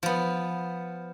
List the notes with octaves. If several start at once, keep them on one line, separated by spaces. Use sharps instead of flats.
F3 B3